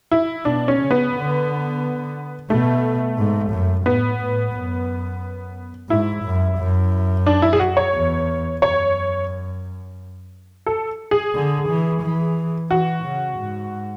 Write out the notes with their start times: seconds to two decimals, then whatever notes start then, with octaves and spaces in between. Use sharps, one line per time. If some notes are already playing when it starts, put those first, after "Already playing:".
0.11 E4
0.45 B2 D4
0.68 C#4
0.79 C#3
0.91 B3
1.13 D3
2.49 B2 A3
3.17 G#2
3.52 F#2
3.85 A2 B3
4.20 A2
4.53 F#2
5.89 G#2 E4
6.24 F#2
6.58 F#2
7.26 D4
7.42 E4
7.53 G#4
7.60 F#4
7.77 C#5
7.94 E2
8.62 F#2 C#5
10.66 A4
11.11 G#4
11.35 D3
11.69 E3
12.02 E3
12.70 E3 F#4
13.05 C#3
13.38 G#2